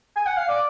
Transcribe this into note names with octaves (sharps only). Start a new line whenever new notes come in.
G#5
F#5
F5
D5